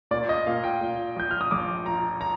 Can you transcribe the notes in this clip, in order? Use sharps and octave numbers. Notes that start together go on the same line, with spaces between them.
A#2 D5
D#5
A#2 F5
G5
A#2
F3 G6
F6
D#6
A#1 D6
F3 A#5
A#5